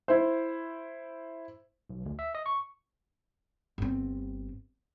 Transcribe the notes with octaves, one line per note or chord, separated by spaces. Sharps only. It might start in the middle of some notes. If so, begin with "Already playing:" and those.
E4 C5
B1
D2
E5
D#5
C#6
G1 C4